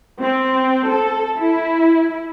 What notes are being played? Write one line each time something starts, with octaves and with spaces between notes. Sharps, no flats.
C4
A4
E4